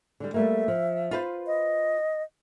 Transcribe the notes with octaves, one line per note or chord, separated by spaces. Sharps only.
D3 G3
G3 A3 A#3 E5
F3
F4 B4 C5
D#5